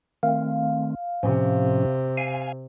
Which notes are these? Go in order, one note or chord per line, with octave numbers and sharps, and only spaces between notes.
D#3 A3 C4 F5
A2 C3 F3 C#4
F5 G#5